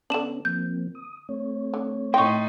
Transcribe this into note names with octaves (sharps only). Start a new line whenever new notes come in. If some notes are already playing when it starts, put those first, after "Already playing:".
D3 B3 C#4 D4 E7 F#7
F3 A#3 C4 G6
D#6
A3 C4 C#5
D3
A2 D#4 G5 C6 C#6